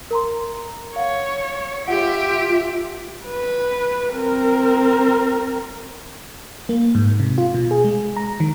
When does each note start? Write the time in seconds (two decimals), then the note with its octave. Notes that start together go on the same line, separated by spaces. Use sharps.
0.11 A#4 A#5 C6
0.96 C#5 F5 F#5
1.88 F4 G4 E5 F#5
3.26 B4
4.13 C4 A#4
6.69 A#3
6.95 G#2
7.20 C3
7.38 F4
7.54 B2
7.71 G#4
7.85 G#3
8.17 A#5
8.40 D#3